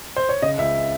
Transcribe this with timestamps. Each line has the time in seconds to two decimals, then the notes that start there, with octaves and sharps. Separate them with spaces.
0.16 C5
0.29 C#5
0.42 C#3 D#5
0.58 C#2 E5